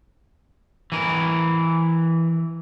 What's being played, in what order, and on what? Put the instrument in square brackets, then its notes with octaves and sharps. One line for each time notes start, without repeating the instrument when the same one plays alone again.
[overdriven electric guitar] E3 A#4